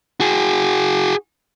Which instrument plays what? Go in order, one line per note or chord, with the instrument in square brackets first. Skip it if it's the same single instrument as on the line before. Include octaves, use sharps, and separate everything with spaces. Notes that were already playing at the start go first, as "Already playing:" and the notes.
[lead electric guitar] F#4 G#4